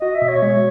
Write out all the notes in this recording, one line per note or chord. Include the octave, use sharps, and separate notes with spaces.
F#4 D#5
E5
B2
C#5
G#3